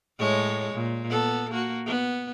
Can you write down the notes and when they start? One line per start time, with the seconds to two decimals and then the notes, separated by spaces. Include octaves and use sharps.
0.18 A2 G#3 C#5
0.74 A#2
1.09 B3 A4
1.51 A#3 F#4
1.86 B3